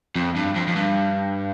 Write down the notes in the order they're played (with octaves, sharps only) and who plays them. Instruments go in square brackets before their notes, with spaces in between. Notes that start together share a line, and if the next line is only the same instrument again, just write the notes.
[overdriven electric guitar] F2
G2
F2
F2
G2